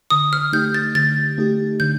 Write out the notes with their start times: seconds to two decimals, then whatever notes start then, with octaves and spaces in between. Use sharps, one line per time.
0.10 D3 D#6
0.33 F6
0.53 A3 D#4 G4 G6
0.74 A6
0.95 D3 A6
1.38 A3 D#4 G4
1.80 D3 G6